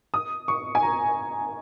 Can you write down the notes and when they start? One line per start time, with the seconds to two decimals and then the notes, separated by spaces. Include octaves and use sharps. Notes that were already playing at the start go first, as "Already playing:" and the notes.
0.14 D#6
0.48 C#6
0.75 G#5
0.83 A#5